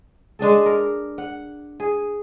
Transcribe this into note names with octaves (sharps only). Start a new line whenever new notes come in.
G#3 D4 G#4 A4
A#4
F#5
G#4